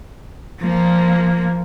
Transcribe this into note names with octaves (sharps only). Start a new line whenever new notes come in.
F3 A#3